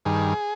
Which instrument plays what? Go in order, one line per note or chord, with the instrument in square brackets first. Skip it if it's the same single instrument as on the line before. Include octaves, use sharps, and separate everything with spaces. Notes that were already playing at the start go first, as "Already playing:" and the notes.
[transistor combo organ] G2 D#3 G#4